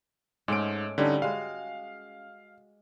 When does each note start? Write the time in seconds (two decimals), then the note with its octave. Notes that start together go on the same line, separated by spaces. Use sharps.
0.48 G#2 G#3 A3 C#4 D7
0.98 D3 G3 A3 C#4 D#4 D#5
1.22 G#3 F#4 F5